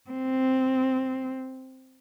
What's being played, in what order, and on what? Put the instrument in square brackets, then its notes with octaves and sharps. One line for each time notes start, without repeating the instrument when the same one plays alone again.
[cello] C4